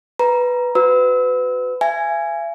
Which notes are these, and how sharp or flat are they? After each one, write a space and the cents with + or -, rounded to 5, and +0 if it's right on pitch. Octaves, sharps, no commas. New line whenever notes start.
B4 +0 A#5 +15
F#4 -10 B4 +30 E6 -30
E5 +45 G#5 +0